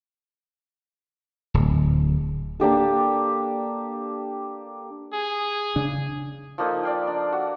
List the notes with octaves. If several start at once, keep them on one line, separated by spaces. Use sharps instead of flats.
D1
A#3 D4 G4 A4
G#4
C#3 D4
F3 A#3 D#4 A4
D5 F5 G5
D4
F#4